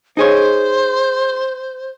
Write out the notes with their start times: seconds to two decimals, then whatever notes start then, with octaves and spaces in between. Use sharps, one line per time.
0.17 D#4 G#4 C5 C#5